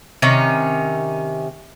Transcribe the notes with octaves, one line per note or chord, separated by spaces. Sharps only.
C3 D#3 C#4